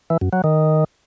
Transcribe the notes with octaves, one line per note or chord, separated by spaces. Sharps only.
E3
F#2
F#3
D#3